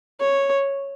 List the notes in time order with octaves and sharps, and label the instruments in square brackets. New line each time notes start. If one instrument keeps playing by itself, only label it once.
[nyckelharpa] C#5